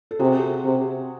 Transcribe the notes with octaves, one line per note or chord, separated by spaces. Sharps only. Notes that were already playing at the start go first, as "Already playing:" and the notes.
A4
C3 F#4 G#4
C3